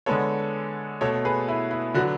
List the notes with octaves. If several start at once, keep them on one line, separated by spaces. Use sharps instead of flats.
D3 G#3 B3 A4 C#5
B2 A3 A4 C#5
G#4 B4
E4
E4
D3 F#3 B3 F#4